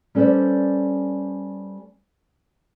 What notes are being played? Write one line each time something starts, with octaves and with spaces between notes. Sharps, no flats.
G3 C#4 A4 B4 C5 D5